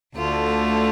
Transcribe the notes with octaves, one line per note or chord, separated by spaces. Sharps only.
D2 D3 A3 F4